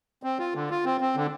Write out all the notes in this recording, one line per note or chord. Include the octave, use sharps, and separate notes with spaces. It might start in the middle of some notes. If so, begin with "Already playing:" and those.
C4
F4
D3
F4
C4
C4
D3